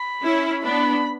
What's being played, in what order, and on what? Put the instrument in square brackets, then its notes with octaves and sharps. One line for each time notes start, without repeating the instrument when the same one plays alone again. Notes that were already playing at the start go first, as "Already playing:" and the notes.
Already playing: [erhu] B5
[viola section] C#4 E4
[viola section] B3 D4 [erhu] B5